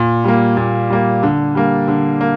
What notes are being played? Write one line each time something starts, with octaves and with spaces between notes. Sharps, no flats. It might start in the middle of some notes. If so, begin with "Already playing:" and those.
Already playing: A#2
G3 A#3
A#2
G3 A#3
D3
G3 A#3
D3
A#3